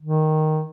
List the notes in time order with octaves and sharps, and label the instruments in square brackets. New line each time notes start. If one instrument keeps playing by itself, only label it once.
[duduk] D#3